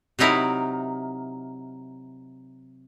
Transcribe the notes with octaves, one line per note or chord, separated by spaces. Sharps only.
C3 F#3 D#4 E4 A#4